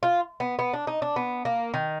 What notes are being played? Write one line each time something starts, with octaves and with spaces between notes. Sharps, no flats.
F4
B3
B3
D4
D#4
D4
B3
A#3
D#3